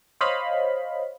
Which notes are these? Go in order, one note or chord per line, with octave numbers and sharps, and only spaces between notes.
C5 C#5 D#5 F5 B5